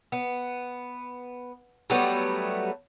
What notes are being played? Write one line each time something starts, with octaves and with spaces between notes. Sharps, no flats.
B3
F#3 G3 A3 B3